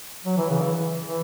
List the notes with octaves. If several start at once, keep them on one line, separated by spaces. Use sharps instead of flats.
F#3
E3
C#3
E3
E3